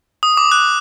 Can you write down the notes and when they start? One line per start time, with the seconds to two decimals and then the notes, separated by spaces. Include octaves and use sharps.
0.23 D#6
0.37 D6
0.52 F#6